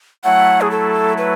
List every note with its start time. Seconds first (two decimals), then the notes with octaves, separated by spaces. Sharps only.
0.24 F#3 A3 E4 F#5
0.61 G#4
0.71 A4
1.18 B4